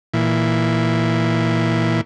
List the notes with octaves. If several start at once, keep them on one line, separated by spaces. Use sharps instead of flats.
A#2 E3